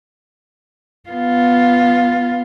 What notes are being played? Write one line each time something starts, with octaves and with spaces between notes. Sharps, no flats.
B3 F4